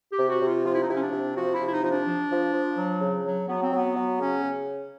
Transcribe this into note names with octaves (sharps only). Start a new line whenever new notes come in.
G4
C3
F#4
C3
F4
F3 F4
E4
D#4
C3 E4
C#4
D4
C3
F3 F#4
E4
C3
E4
D#4
F3 D#4
D4
F3
F3
F3
F#3
C#3
F#3
F#3 B3
C4
F#3 B3
F#3
C#3 C#4
C#3